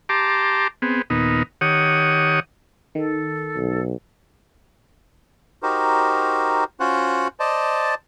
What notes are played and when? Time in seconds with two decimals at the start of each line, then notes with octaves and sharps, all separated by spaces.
0.09 G4 A5 A#5 C6 D6
0.82 B3 C4 G#4
1.10 D#2 A#2 B3 D#4
1.61 D#3 G4 C#5 F#5 D#6
2.95 D#3 A4
3.56 B1
5.63 D#4 F#4 G4 A#4 C5
6.80 C#4 F4 F#4 C5 F#5
7.40 C5 D5 D#5 A5